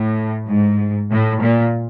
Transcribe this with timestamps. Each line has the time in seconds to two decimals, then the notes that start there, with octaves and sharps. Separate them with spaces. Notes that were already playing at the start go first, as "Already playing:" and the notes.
Already playing: A2
0.49 G#2
1.11 A2
1.41 A#2